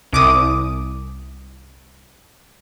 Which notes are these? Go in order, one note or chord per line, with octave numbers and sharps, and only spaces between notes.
C2 D6 D#6